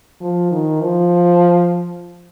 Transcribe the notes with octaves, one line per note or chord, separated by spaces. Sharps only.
F3
D#3
F3